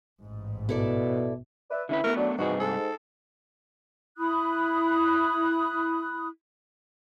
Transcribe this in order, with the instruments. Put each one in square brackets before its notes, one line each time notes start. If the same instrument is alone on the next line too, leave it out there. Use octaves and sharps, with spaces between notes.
[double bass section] A1 G#2
[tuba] B2 [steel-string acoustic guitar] E4 A4 D5
[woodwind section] B4 D5 E5
[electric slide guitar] D3 C#4 B4 [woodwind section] E4
[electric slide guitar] A3 B3 [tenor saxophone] A#4
[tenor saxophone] F#3 [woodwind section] D4
[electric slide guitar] G2 C3 G#4 [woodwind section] E3 F3 D#4 [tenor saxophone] F#4
[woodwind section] G#2 [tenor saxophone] A4
[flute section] E4 B5 D#6 F#6